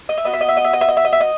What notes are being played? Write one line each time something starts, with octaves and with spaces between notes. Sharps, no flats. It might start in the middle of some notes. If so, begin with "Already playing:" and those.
D#5
E5
B3 F#4 D#5
E5
D#5
E5
D#5
E5
D#5
E5
D#5
E5
D#5
E5
D#5